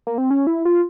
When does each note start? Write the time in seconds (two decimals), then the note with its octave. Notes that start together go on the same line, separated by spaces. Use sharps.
0.07 A#3
0.18 C4
0.31 C#4
0.47 E4
0.65 F4